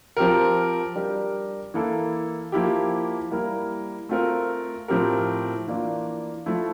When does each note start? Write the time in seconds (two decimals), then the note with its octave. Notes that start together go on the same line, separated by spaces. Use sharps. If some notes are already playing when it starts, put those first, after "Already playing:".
0.17 F3 C4 G4 A#4
0.96 G3 D4 G4 A#4
1.74 E3 A#3 E4 A4
2.52 F3 A#3 E4 G4
3.31 G3 A#3 E4 A#4
4.09 A3 C4 F4 A#4
4.88 A2 F3 C4 G4 A#4
5.67 E3 A#3 D4 F4
6.46 F3 A3 E4